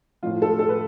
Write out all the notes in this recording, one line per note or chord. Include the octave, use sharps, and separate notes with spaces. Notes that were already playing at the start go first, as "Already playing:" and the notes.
A2 F3 F4
A4
A4
B4